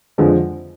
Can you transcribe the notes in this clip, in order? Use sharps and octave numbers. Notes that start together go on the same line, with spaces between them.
F2 D3 F3 G#3